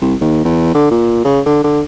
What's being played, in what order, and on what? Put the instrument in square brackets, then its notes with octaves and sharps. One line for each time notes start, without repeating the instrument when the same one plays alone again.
[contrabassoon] C2
D#2
E2
D3
A#2
C#3
D3
D3